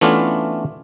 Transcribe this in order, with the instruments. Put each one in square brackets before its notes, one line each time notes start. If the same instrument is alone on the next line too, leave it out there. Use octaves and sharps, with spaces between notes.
[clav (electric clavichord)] E3 A3 B3 C#4 D4 F4